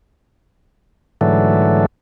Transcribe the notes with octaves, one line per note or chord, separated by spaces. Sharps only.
G#2 D3 E3 F#3 A3